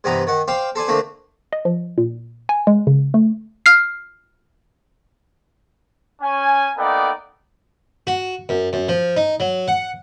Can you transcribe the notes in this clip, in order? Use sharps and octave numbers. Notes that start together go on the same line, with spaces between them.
G2 C3 E3 B3 D#5 A#5
D#3 F#5
C5 D5 F5 G5 C6
A4 C5 D5 G#5
D3 A3 A#3 C4 D4
D#5
F3
A#2
G#5
G#3
C#3
A3
F6 C7
C#4 G#5
A#3 B3 D#4 A4 D5 G5
F#4
F#2
F#2
F3
D#4
F#3
F#5